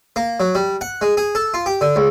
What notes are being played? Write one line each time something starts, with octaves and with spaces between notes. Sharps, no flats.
A#3
F#3
G3
F#5
G#3
G#4
A4
F4
G4
D3
C#2